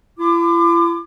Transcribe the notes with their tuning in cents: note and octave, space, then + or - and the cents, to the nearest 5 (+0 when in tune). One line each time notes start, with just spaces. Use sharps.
E4 +45 D6 +25